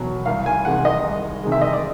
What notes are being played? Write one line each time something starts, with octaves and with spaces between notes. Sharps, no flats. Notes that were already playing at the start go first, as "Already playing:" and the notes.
Already playing: E2 B2 F#3
C2 F5
G#5
C3 D#3 G#3 F#5
D#5
C2
C3 D#3 G#3
E5
D#5
D5